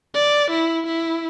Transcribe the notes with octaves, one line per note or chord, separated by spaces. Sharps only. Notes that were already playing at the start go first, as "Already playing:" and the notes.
D5
E4
E4